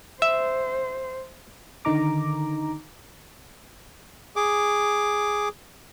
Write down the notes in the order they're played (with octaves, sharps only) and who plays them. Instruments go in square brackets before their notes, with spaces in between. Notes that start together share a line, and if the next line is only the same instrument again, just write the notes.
[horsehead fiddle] C5 [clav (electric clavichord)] E5
[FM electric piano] D3 D#3 D#4 A#5 D6
[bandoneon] G#4 D6